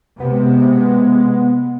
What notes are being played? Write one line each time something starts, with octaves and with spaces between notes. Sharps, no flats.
C3 G#3 B3